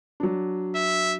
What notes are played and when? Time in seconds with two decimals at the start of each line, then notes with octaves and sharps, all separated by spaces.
0.20 F#3 D4
0.75 E5